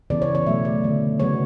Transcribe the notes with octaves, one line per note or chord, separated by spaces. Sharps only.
C#3 E3 B3 D5
C#5
C#5
B2 F#3 A3 E5
D5
D3 A3
C#3 F#3 B3 C#5